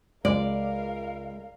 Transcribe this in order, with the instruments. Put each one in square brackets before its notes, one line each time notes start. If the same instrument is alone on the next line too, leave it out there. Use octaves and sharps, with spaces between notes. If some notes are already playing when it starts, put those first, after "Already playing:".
[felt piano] C#2 [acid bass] G#3 [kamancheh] A#4 F5 [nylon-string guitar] D5